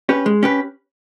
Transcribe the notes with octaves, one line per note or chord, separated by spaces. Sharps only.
C#4 G4 B4
G#3
C#4 G4 B4